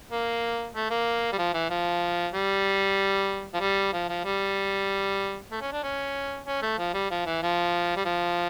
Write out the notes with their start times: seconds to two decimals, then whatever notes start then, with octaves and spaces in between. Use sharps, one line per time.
0.11 A#3
0.75 A3
0.90 A#3
1.33 G3
1.38 F3
1.54 E3
1.70 F3
2.34 G3
3.54 F3
3.60 G3
3.93 F3
4.09 F3
4.25 G3
5.52 A3
5.62 C#4
5.73 D4
5.83 C#4
6.47 C#4
6.62 A3
6.79 F3
6.94 G3
7.11 F3
7.26 E3
7.43 F3
7.97 G3
8.05 F3